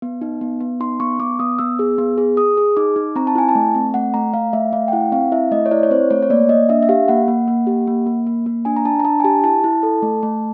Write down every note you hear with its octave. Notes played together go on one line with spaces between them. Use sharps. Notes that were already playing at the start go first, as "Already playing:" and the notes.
B3
D#4
B3
B3
D#4 C6
B3 C#6
B3 D6
B3 D#6
B3 E6
G#4
B3
G#4
G#4 D#6
G#4
D#4 D6
D#4
C4 A#5
A5
E4 G#5
A5
A3
C4
A3 F#5
A3 A#5
A3 F5
A3 E5
A3 F5
G5
E4 F#5
C4 F5
E4 E5
A3 D#5
C#5
E4 D5
C#5
C4 C5
A3 C#5
C#5
A#3 D5
A#3 D#5
D4 E5
E5
G4 F5
A#3 F#5
A#3
A#3
G4
A#3
A#3
A#3
A#3
D4 G#5
A#5
D4 A5
A#5
D4 A5
G#5
G4 A5
E4 A5
E4
A4
A3
A3